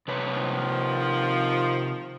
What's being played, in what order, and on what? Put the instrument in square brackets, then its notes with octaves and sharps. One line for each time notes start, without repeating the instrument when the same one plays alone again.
[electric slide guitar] C3 B4 C#5
[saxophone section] D#3 F3